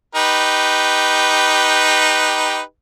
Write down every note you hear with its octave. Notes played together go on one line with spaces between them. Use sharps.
D#4 G4 B4